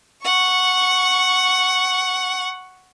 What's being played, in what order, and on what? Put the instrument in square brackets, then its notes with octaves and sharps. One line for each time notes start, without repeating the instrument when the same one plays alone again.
[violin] F#5 C#6